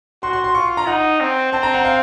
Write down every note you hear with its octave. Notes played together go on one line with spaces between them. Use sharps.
F#4 C6
C6
C6
F4 C#6
A#5
D#4 F#5
C4
C4 A5
A#5
F#5
F5